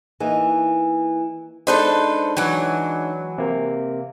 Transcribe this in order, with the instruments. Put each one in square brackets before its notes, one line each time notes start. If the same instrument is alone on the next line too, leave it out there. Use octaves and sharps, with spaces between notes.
[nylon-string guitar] E3 A#3 D#4
[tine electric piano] G#3 D4 D#4 [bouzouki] A4 B4 C5
[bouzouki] E3 F#3
[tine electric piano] C3 A#3